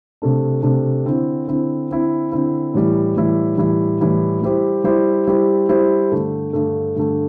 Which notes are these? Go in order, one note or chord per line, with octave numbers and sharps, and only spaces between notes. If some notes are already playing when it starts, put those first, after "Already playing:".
C3 A3 D4
C3 A3 D4
D3 C4 E4
D3 C4 E4
D3 C4 E4
D3 C4 E4
A2 E3 G3 E4
A2 E3 G3 E4
A2 E3 G3 E4
A2 E3 G3 E4
G3 E4 G4 C5
G3 E4 G4 C5
G3 E4 G4 C5
G3 E4 G4 C5
G2 D3 A3
G2 D3 A3
G2 D3 A3